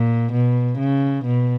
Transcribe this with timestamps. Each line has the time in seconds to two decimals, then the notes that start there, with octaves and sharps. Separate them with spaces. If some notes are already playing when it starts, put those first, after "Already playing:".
Already playing: A#2
0.32 B2
0.78 C#3
1.25 B2